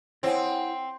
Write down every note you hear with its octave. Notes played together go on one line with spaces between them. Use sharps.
C4 E4 C5 C#5 F#5 G#5